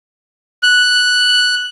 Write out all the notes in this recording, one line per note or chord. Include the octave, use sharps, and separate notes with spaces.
F#6